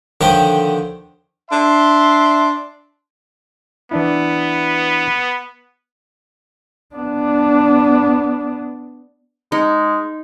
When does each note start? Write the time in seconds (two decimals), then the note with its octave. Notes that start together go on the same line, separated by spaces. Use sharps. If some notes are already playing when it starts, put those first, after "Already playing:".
0.21 D3 D#3 F3 G4 C5 C#5
1.51 D4 E5 C6
3.91 E3 B3 D4 E4
6.95 B3 D4
9.52 G#3 D#4